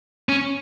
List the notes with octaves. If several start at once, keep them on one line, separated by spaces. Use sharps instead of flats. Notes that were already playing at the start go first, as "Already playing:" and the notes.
C#4